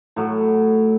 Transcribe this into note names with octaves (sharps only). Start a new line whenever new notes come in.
A2 F#3